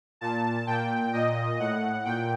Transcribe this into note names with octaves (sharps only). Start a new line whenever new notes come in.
A#2 A5
A#2 G5
A#2 D#5
A2 F#5
A#2 G5